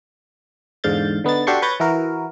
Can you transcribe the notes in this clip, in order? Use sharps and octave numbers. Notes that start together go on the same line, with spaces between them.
E2 G#2 D3 F5 G6 A6
D3 B3 D#4 A6
D4 F#4 G4 A4 C6 C#6
B4 C#5 C#6 G6 A6 A#6
E3 E4 F#4 A#4